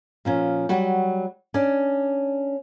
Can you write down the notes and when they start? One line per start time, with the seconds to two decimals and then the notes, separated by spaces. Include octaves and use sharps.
0.25 A#2 F3 C#4
0.69 F#3 G3 F#4
1.54 C#4 D4 D5